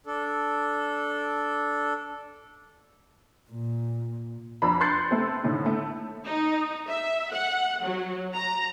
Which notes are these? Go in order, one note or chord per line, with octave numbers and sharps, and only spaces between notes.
D4 A4
A#2
F2 D4 A#5 B5
C6 F#6 G6 A6 C7 C#7
A3 C4
A2 D3 D#3
A3
D#4
E5
F#5
F#3
A#5